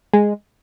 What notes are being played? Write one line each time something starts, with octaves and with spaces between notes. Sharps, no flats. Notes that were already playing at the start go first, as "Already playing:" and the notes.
G#3